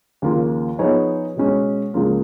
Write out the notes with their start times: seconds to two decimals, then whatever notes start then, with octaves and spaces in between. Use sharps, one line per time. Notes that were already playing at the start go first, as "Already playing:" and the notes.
0.22 D#2 C#3 F3 A#3 F4
0.79 F3 B3 D#4 G#4 C#5
1.36 B2 G#3 C#4
1.94 C#2 C#3 F3 A#3 F4